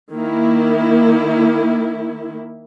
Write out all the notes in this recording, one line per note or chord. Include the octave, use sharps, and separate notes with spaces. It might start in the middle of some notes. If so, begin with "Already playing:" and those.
D#3 A#3 E4